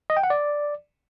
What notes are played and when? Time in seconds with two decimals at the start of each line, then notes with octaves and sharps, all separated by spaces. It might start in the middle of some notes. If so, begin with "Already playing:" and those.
0.10 D#5
0.17 G5
0.23 F#5
0.30 D5